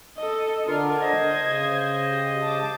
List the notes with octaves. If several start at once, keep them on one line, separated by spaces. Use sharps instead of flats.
A4 D#5
D3 D4 F4 A#4
C5 D#5 G#6
C#3
G4
A5 D6